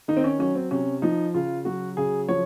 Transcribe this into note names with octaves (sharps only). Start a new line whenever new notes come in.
D#3 D#4
C4
C#4
F#3 C#4
C4
C3 C#4
F3 D#4
C#3 F4
F#3 F#4
C#3 G#4
F3 C#5